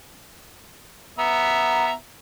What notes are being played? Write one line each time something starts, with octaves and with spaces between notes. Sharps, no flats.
B3 E5 A#5